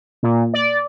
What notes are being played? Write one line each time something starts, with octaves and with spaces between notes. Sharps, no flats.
A#2
D5